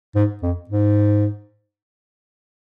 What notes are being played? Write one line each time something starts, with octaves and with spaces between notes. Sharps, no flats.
G#2
F2
G#2